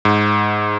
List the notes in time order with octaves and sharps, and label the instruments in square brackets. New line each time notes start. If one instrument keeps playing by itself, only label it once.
[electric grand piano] G#2